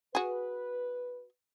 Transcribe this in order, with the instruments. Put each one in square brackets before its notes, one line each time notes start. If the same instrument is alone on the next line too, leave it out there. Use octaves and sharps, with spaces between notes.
[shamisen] F#4 G#4 [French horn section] B4